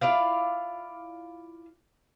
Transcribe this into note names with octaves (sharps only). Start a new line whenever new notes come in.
E4 F4 D5 F5